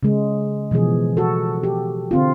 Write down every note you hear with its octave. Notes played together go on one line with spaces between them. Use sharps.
C#3 G#3
B2 E3 F3 G#4
F#4 A4
G4
D3 C4 F4